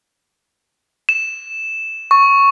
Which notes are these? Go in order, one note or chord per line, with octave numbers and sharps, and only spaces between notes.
E7
C#6